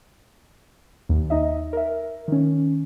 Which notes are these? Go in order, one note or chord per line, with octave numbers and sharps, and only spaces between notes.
D#2
D#4 D#5 E5
A#4 E5
D#3 C#4